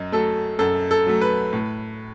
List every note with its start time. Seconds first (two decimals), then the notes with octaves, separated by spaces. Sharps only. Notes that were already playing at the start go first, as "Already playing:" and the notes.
Already playing: F#2 D#5
0.12 F#3 A3 A4
0.59 F#2 A4
0.91 A4
1.07 F#3 A3
1.21 B4
1.53 A2